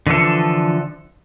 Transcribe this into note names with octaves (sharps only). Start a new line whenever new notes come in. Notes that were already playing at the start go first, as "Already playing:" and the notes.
D3 E3 F3 A4